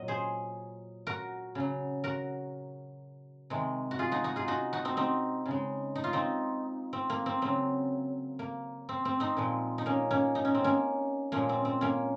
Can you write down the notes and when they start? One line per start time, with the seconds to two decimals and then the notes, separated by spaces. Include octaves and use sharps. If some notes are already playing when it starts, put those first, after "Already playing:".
Already playing: A#2 F#3 D#5
0.08 G#4 C5
1.07 F#4 A#4
1.55 C#3 F#3
2.04 F#4 A#4
3.50 C3 D#3 G#3
3.91 F#4
3.99 F4 G#4
4.12 D#4 F#4
4.24 D#4 F#4
4.36 F4 G#4
4.48 D#4 F#4
4.73 D#4 F#4
4.85 C4 D#4
4.97 C4 D#4
5.46 C#3
5.51 G#3
5.95 D#4
6.04 F4
6.13 C4 D#4
6.93 C4
7.10 A#3
7.26 C4
7.41 C#3 F#3 C4
8.39 A#3
8.89 C4
9.05 C4
9.20 C4 D#4
9.37 A#2 F3 G#3
9.78 D#4
9.86 A#3 C#4
10.11 A#3 C#4
10.35 D#4
10.45 C#4
10.54 C4
10.64 A#3 C#4
11.32 A#2 F3 G#3 A#3 C#4
11.49 C4
11.65 C4
11.81 A#3 C#4